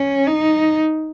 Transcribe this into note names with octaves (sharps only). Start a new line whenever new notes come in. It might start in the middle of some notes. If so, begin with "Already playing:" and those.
Already playing: C#4
D#4